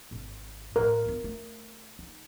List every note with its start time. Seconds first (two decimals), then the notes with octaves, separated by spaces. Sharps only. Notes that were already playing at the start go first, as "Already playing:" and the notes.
0.11 G#1 G#2
0.76 A2 A3 A#4
1.06 B3 F4
1.24 A3
1.99 D#4